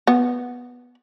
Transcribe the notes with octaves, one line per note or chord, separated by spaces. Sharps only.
B3